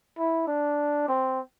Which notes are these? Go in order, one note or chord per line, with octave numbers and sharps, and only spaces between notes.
E4
D4
C4